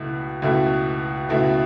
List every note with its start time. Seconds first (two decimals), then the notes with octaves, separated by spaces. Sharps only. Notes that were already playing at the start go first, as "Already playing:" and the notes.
Already playing: C#2 B2 A3 E4
0.42 C#2 B2 A3 E4
1.29 C#2 B2 A3 E4